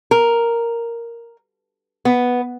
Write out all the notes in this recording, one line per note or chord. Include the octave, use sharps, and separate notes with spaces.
A#4
B3